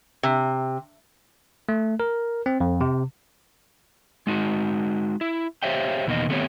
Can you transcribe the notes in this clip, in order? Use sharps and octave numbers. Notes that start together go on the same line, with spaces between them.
C3
A3
A#4
C4
F2
C3
G#3 D#4 F#4
E4
G4 C5 C#5 E5 F5 G5
E2 B2 D#3 A#3 D#5
D#3 A3 B3 C4 G4 C#5